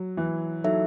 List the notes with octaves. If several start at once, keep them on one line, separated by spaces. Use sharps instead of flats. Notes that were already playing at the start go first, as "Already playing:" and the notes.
Already playing: F#3
E3
F#3 D#4 A4 E5